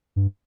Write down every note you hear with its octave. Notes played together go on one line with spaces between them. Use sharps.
G2